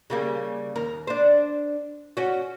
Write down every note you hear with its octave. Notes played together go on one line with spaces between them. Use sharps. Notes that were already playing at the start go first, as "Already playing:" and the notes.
C#3 G3 A#3
D#2 A#4
D4 C5
C#4 F#4